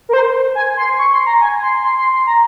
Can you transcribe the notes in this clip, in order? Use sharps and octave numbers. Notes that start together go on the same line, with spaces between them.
A#4
C5
G#5
C6
C#6
C6
A#5
G#5
C6
C6
C6
C6
A#5